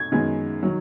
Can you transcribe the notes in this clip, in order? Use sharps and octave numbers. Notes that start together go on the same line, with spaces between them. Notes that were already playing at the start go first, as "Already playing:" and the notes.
Already playing: G#6
F#2 D#3 G#3 B3
D#3 F#3